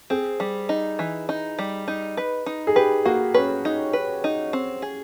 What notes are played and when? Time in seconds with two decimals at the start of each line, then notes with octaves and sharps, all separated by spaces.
0.10 C4 G#4
0.40 G3
0.69 D#4
0.99 E3
1.29 D#4
1.59 G3
1.88 D#4
2.17 B4
2.46 D#4
2.67 G#4
2.76 G4 B4
3.05 A#3 F#4
3.34 C#4 B4
3.65 D#4
3.93 B4
4.24 D#4
4.53 C4
4.82 G#4